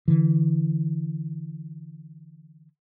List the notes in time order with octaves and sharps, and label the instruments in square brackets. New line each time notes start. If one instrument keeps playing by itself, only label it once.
[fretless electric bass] D3 E3